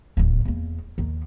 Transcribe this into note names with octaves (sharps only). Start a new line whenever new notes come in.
D1 D#2
E2 A#3
D#2 D#3